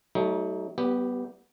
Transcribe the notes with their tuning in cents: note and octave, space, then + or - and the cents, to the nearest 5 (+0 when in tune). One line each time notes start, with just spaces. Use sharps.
F#3 +45 A3 +0 D#4 +25
G3 -35 B3 +0 G4 +0